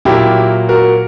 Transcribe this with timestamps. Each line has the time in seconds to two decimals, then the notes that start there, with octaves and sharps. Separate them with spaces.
0.05 A#2 F#3 A#3 E4 G4
0.69 F#4 A#4